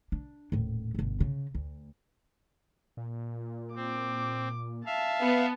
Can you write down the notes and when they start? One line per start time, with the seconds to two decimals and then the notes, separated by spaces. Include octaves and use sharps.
0.12 D4
0.52 D#1 A2
0.95 G1 B2
1.20 C#3
1.55 D2
2.97 A#2
3.75 C4 D6
4.86 E5 F5 A5
5.21 B3